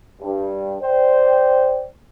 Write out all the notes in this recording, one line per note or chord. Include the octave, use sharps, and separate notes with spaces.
G2
C5 D5 G5